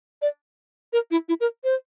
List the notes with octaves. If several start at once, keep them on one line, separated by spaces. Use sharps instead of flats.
D5
A#4
E4
E4
A#4
C5